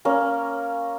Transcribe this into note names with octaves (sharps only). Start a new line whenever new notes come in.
A#3 C#4 A#4